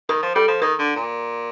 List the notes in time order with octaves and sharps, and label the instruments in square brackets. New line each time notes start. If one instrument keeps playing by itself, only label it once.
[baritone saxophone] D#3 [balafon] A#4
[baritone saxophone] F3
[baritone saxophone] G3 [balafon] A4
[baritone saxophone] F3
[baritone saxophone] D#3 [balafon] A#4
[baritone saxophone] D3
A#2